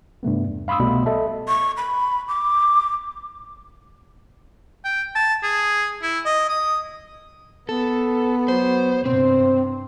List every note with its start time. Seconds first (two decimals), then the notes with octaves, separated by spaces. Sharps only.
0.23 G2 C3 A3 B3
0.44 E2
0.68 F5 B5 C6 D#6 E6
0.80 C2 B2 G3 A3 B5
1.06 A4 D#5 E5 A5
1.48 C#6
1.77 B5
2.28 D6
4.85 G5
5.15 A5
5.43 G#4
6.02 E4
6.25 D#5
6.49 D#6
7.69 B3 A4
8.48 F#3 C5
9.06 G2 C3 C4 C5